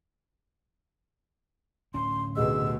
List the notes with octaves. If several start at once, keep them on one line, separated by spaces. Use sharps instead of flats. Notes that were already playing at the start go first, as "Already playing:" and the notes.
D1 C#4 C6
D2 B2 G4 G#4 D#5 E6